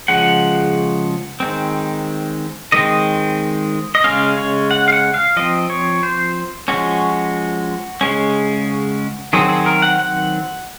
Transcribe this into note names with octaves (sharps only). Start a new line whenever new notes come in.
C#3 F3 G#3 F#5
D#3 G#3 C4
D#3 G#3 C4 D#5
D#5
C#3 G#3 C#4 F5
C#5
F#5
F5
F#5
F5
F3 C4 D#5
C#5
C5
F3 G#3 C#4 F#4
C#3 G#3 C#4
D#3 F#3 C4 G#4
G#4
A#4
F#5
F#5